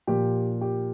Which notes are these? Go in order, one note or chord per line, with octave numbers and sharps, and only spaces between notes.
A#2 F3 G4
G4